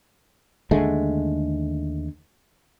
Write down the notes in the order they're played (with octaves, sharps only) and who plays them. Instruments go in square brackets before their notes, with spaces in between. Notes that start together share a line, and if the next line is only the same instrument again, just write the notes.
[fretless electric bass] D#2 D3 G#3 A3